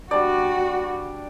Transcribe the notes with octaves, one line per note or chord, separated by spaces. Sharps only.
G3 D4 F#4 D5